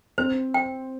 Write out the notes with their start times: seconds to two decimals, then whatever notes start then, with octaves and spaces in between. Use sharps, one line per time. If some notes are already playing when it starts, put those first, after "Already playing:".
0.18 C4 C5
0.54 G5